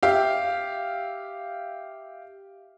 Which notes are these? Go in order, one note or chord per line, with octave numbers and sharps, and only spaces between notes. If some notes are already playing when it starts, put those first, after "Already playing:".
G4 E5 F5